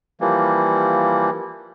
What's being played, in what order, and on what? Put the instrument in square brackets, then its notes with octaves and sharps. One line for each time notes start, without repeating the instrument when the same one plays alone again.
[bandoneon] E3 F3 G3 A#3